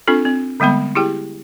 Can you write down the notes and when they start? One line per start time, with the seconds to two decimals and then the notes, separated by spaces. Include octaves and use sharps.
0.08 C4 D4 F4 A4
0.25 C4
0.60 D3 G3 G#3 B3 B5
0.95 E4 G4 G#4 G5